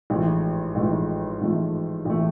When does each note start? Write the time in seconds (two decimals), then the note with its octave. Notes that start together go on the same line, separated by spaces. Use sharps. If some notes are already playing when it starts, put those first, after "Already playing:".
0.10 A1 G#2 F3 A3
0.75 A1 G#2 F3 A3
1.40 A1 G#2 F3 A3
2.05 A1 F3 A3